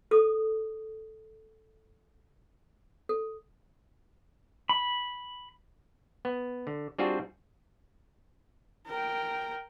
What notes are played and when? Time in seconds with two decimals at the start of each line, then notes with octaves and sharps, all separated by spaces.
0.11 A4 D#6
3.09 A4
4.69 B5
6.25 B3
6.67 D3
6.99 G3 C4 D4 F4 F#4 G#4
8.87 A#4 G5